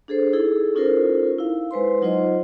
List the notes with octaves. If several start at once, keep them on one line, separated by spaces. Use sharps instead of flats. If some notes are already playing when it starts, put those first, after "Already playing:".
D4 G#4 A4 C5
D#4 E4 G#4 A4
C#4 D#4 F4 A4 A#4 C5
E4 F5
G#3 B4 C5 C6
F#3 D#4 F4 C5 D#5